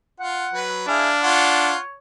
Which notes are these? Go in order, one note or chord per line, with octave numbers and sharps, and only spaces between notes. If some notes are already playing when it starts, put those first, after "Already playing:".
F4 F#5
F#3 B4
D4 E4 G#4 F5
F4 C#5 F#5